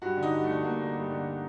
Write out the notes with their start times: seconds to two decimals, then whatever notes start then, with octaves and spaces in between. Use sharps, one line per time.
0.02 G2 F#4
0.17 D3
0.23 D#4
0.34 G2
0.44 D3 A3
0.64 G2 A#3
0.80 D3
0.96 G2
1.10 D3